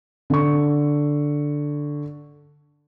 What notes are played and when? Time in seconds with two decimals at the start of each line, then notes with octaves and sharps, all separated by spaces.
0.30 D3 C#6